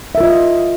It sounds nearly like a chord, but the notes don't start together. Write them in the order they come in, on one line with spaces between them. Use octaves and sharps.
E5 A#4 F4 D#5